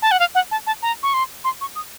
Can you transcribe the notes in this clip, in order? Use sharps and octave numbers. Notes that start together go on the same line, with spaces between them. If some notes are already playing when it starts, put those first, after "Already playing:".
A5
F#5
F5
F#5
A5
A5
A#5
C#6
C6
C6
C#6
D#6